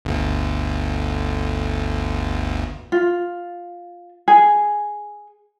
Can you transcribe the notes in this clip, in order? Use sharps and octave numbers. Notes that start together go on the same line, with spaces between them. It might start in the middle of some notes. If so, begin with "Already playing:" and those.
G1 D2
F4
G#4